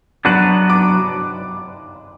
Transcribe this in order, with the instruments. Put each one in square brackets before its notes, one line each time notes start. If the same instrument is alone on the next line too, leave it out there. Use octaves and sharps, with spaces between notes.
[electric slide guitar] F#3 B3 D4 F#4 B4 [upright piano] F#6
[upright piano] D6